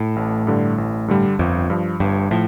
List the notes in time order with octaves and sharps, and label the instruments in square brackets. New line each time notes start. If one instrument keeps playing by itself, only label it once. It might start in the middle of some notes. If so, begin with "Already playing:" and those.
Already playing: [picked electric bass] A2
[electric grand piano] A1
G2 D3 G3
A1
G2 D3 G3
[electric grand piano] G1 [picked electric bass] F2
[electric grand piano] G2 F3
[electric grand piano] G1 [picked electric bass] G2
[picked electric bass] A2 [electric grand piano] F3